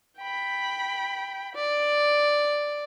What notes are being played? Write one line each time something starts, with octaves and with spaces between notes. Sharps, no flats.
G5 B5
D5